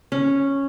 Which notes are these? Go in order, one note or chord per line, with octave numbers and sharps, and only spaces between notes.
C#4